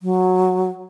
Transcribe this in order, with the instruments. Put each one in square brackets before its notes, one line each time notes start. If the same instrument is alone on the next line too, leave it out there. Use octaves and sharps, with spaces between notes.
[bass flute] F#3